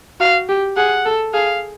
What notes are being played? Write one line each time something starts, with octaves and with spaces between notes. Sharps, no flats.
F#4 F5
G4
G#4 F#5
A4
G#4 F5